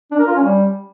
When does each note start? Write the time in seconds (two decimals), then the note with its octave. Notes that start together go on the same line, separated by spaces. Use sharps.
0.11 D4
0.19 A#4
0.27 F4
0.35 C#4
0.43 G3